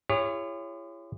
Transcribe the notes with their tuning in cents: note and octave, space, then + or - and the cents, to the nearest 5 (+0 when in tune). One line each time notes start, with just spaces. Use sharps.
E4 +40 G#4 -45 C#5 +0